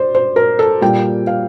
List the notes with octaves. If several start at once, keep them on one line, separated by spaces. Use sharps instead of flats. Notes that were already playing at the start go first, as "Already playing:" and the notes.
Already playing: C5 D5
C5
A#4
A4
A#2 G3 A#3 G5
F5